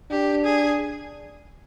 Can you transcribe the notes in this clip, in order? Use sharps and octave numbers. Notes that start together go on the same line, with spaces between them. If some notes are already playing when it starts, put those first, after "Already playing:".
D4 G4
G#4